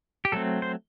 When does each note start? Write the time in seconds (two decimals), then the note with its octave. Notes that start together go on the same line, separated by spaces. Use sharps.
0.25 G4
0.32 F#3 A3 C4 A4
0.62 C5